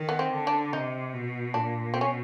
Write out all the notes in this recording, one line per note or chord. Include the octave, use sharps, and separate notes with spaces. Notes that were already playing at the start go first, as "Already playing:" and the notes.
Already playing: D#3
B3
C4
D3
D4
C3 D#4
B2
A#2 D4
B2 C4
C#4